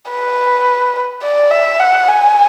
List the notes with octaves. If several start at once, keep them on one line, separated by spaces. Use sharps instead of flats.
B4
D5
E5
F#5
G#5